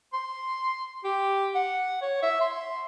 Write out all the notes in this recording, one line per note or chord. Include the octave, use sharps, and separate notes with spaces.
C6
G4
F#5
C#5
E5
C6